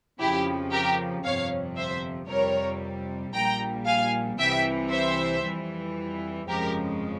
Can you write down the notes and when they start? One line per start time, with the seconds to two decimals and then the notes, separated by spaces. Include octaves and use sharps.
0.19 F2 C#3 F3 E4 G4
0.72 G4 A#4
1.24 G1 F2 C3 C#5 F5
1.76 C5 E5
2.29 F2 C3 G3 A#4 C#5
3.33 A#1 A#2 G3 G5 A#5
3.86 F5 G#5
4.38 C2 C3 E3 E5 G5
4.91 C5 E5
5.44 F2 E3 G3
6.48 G1 F2 C#3 F3 G#3 G4 A#4